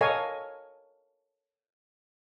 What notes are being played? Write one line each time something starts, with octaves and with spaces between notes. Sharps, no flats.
A4 A#4 C#5 D#5 F5 G#5